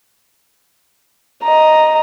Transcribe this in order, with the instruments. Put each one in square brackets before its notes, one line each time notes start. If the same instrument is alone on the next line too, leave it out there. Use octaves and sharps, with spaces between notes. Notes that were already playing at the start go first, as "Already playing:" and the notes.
[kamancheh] D#5 A#5